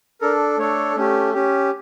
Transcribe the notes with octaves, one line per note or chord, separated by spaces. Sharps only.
D4 A4 A#4
A3 D4 A4 C#5
A3 C#4 G4
C#4 G4